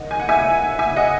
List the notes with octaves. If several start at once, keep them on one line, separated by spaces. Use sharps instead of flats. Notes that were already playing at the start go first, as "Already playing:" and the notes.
Already playing: D#3 D#5 F#5
G#5
F#5
E5 G#5
E5 G#5
D#5 F#5